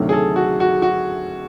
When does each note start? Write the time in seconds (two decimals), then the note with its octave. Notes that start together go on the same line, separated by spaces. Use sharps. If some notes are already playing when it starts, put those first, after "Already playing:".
Already playing: D2 C3 D#3 F#3 A3
0.09 G#4
0.13 A4
0.36 F#4
0.60 F#4
0.82 F#4